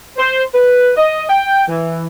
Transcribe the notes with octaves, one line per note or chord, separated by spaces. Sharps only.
C5
B4
D#5
G5
E3